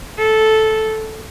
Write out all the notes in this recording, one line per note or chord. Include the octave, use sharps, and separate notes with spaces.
A4